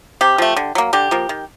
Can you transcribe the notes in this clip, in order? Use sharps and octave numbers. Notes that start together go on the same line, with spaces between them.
C3 G4
F3 A3
D3
F#3 A#3
D3 G4
F3 A#3
D#3